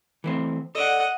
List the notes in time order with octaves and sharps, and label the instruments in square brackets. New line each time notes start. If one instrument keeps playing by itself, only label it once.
[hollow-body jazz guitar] E3 A3 C4
[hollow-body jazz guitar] A4 D5 [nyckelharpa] D#5 F#5